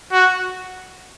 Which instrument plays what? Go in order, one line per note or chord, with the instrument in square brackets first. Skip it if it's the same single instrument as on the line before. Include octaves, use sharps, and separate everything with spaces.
[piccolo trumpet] F#4